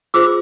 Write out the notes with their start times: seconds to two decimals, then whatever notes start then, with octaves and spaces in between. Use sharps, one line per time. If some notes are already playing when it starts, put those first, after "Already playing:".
0.14 F4 G#4 C5 D6 E6